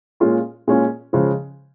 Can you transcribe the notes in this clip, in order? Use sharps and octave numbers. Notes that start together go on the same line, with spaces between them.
A#2 G#3 C#4 F4
A#2 G#3 C#4 F4
C#3 F3 G#3